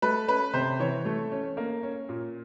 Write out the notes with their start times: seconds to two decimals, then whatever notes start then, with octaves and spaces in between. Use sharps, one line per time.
0.02 A3 B4
0.28 C#4 B4
0.53 C3 C5
0.79 E3 C#5
1.05 A3
1.32 C#4
1.57 A#3
1.83 C#4
2.09 A#2